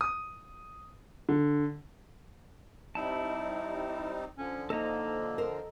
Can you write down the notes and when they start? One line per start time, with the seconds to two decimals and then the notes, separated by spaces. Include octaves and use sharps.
0.01 D#6
1.29 D3
2.95 G3 C4 D#4 E4 A5
4.38 D3 F3 C#4
4.70 A#3 D#4 A4 D#5 A#5
5.38 A#4 C5